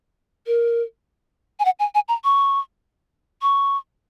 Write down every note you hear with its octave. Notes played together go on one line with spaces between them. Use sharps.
A#4
G#5
F#5
G#5
G#5
A#5
C#6
C#6